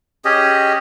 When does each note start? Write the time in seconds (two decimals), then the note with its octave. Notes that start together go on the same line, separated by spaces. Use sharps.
0.25 C#4 G4 G#4 D#5